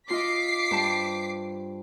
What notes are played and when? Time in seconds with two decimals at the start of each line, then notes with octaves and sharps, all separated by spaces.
0.10 F4 D#5 D6 B6 C7
0.71 G2 C5 A5